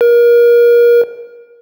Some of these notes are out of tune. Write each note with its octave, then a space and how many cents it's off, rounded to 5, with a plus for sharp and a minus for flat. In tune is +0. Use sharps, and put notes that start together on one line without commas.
A#4 +30